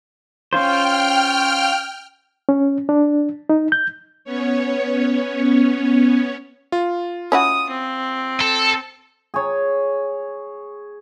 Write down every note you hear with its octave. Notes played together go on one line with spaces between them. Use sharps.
C#4 F4 C5 G5 F6
C#4
D4
D#4
G6
B3 C#4 C#5
F4
C#4 E4 F#4 D#6
C4
A4
G#4 C#5